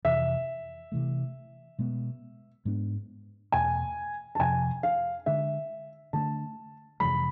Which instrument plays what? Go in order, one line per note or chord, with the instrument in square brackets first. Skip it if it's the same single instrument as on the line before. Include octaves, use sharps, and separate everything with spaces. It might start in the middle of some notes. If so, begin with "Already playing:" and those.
[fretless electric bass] F2 C3 E3 [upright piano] E5
[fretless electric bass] C3 E3 A3
B2 G#3 B3
G#2 G#3 B3 D4
[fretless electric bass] E2 B2 A3 [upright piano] G#5
[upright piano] A5
[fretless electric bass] F2 C3 F3 [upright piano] G#5
[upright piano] F5
[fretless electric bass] D3 G#3 D4 [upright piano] E5
[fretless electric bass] D3 A3 D4 [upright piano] A5
[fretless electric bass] F2 C3 E3 G#3 [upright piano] B5